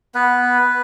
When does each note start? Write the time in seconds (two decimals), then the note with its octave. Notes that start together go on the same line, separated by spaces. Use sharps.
0.15 B3 B4